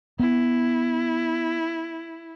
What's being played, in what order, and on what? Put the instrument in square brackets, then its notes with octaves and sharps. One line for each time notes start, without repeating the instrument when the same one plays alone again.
[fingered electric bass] B3 [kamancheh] E4